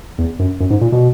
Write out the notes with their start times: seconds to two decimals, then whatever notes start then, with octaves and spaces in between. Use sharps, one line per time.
0.18 E2
0.39 F#2
0.60 F#2
0.70 G#2
0.81 A#2
0.92 B2